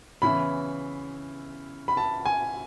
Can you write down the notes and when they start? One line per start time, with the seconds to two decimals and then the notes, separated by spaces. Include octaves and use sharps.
0.22 C#3 E3 B3 E4 B5
1.88 B5
1.97 A5
2.25 G#5